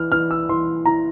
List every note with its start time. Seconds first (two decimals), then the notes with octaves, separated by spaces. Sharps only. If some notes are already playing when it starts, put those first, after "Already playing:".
Already playing: E3 F6
0.12 E3 F6
0.31 E6
0.49 E3 C6
0.86 E4 A#5